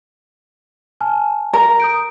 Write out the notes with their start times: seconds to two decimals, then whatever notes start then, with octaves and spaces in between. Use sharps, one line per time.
1.01 G#5 A5 F6
1.53 A#4
1.80 D#6 G6 D7